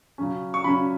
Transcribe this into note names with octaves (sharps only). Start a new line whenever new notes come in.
C#3 F#3 C#4
C#6
C#3 F#3 C#4 B5